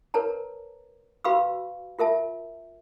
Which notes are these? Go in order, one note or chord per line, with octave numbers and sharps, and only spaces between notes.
A#4 B4 C#5 A5 A#5
F#4 B4 F5 B5 C#6 E6
F4 A#4 E5 A5